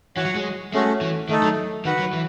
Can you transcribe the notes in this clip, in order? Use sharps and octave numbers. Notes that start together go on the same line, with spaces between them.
E3 F#4 C#5 F#5
F#3
G#3
G#3 A3 C#4 F#4
E3
D#3 A3 D#4 A4
F#3
D#3 F#4 B4 F#5
F#3
E3